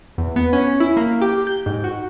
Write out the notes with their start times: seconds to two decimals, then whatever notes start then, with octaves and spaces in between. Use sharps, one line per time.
0.18 E2
0.36 B3
0.53 C#4
0.67 C#4
0.80 E4
0.97 A#3
1.22 G4
1.47 G6
1.66 G#2
1.84 F#4